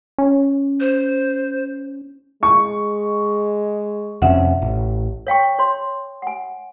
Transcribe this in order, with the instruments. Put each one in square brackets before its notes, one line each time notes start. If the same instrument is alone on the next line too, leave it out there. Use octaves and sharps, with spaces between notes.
[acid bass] C#4
[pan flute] C5
[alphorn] G#3 [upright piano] C#6
[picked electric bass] F2 C3 C#4 [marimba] E5 F#5
[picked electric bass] A1
[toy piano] C#5 F5 G5 C#6
C#5 C6
F#5 G#5